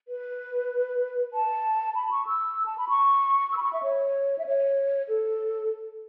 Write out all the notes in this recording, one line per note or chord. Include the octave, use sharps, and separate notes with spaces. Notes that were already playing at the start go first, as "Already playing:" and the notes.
B4
A5
B5
C#6
E6
A5
B5
C#6
E6
B5
C#6
E5
C#5
E5
C#5
A4